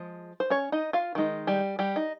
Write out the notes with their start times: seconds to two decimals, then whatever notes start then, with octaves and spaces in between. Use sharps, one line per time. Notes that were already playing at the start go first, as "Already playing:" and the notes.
Already playing: F3 G#3
0.40 C5
0.50 C#4 C#5
0.72 D#4 D#5
0.93 F4 F5
1.15 D#3 G#3 D#4
1.47 G3 G4
1.79 G3 G4
1.96 D#4